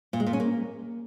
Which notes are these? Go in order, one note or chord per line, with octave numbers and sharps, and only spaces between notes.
A#2
G#3
A#2
C#4
A#3